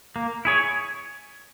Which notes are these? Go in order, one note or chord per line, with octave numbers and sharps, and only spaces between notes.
A#3
E4 G#4 C#5